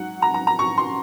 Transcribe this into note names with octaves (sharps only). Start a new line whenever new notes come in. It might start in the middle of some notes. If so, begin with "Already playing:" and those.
Already playing: G#2 F#3 F#5
A#5
A#5
A#5
C#6
C6